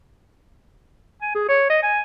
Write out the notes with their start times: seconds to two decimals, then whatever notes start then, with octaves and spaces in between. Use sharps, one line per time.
1.22 G#5
1.35 G#4
1.49 C#5
1.70 D#5
1.83 G#5